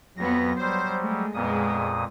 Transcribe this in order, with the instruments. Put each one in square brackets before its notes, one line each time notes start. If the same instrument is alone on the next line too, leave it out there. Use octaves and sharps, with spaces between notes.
[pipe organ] F2 A#6 [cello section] F#3 B3
[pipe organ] F#3 G3 [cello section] C5
[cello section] G#3 A3
[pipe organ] F2 A#2 D#6 [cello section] G#3 B3